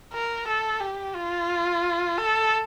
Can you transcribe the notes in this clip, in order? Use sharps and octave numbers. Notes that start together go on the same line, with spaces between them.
A#4
A4
G4
F4
A4